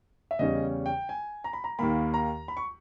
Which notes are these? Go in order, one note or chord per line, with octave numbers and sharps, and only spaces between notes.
E5
E2 C#3 G3 C#4 D#5
G5
G#5
A#5
B5
A#5
D#2 D#3 A#3 B5
A#5
B5
C#6